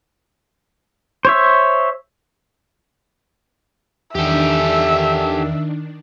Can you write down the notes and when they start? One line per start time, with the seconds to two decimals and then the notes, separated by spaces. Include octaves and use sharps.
1.25 C5 C#5 E5
4.15 E2 D#3 D4 G4 A4 E5